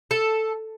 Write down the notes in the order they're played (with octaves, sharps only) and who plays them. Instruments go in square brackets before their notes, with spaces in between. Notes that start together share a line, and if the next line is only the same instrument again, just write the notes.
[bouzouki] A4